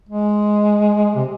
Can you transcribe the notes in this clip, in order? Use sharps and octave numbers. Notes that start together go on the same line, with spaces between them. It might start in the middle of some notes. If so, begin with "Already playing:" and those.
G#3
C3